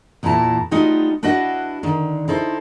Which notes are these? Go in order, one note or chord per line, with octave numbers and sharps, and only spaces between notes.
E2 A#2 E3 E4 A5 A#5
G3 A3 B3 D#4 F4 F#4
D4 E4 F#4 B4 D#5 F#5
D3 D#3
D#4 E4 A4 C5